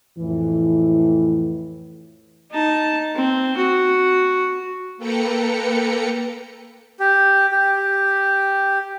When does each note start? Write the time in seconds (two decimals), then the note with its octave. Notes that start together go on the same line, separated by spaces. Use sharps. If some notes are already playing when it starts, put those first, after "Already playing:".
0.19 F2 A2 E3
2.51 D#4 A5
3.15 C4
3.56 F#4
4.97 A#3 A4 B4 G5 A#5 C#7
7.00 G4
7.51 G4